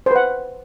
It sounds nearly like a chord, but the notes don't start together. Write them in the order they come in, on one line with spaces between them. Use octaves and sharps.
C5 B4 F#5